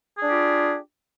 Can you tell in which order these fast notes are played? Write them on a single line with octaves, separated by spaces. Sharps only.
G#4 D4 G4 F4